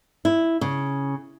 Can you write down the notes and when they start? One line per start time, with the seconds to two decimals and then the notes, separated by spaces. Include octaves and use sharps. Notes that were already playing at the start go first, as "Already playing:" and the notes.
0.25 E4
0.61 C#3